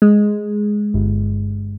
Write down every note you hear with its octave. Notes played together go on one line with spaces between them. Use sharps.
G#3
G1